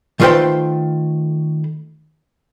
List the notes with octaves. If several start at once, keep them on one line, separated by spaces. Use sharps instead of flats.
D#3 A3 F4 B4 C5 G5